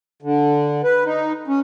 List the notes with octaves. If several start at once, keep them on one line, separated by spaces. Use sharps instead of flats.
D3
B4
D#4
C#4